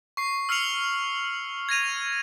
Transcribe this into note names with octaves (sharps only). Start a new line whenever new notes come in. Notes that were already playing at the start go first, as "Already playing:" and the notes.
C#6 C7
E6 F6 C7 C#7 F7 F#7
G#6 A#6 D#7 F7